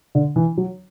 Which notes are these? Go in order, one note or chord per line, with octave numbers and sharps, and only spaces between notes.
D3
E3
F#3